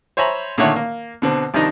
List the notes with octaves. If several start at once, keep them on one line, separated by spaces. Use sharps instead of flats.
C5 C#5 E5 G#5 A#5 B5
A#2 D3 D#3 A3 C#5 F#5
A#3
B2 D3 C4
C2 D#3 F3 D4 D#4 D#5